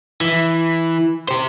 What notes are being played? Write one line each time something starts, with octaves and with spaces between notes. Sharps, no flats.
E3
G4 C5